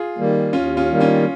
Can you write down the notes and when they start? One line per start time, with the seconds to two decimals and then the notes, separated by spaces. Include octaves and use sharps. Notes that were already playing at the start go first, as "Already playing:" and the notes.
Already playing: F4 G#4
0.17 D#3 G3 A#3
0.53 D#2 C#4 F4
0.77 C#4 F4
0.89 D#3 G3 A#3
1.01 C#4 F4